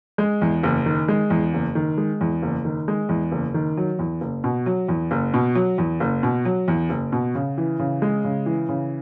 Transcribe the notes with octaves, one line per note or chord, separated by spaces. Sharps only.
G#3
E2
F#1
D#3
G#3
E2
F#1
D#3
G#3
E2
F#1
D#3
G#3
E2
F#1
D#3
F#3
E2
F#1
B2
F#3
E2
F#1
B2
F#3
E2
F#1
B2
F#3
E2
F#1
B2
C#3
E3
C#3
G#3
C#3
E3
C#3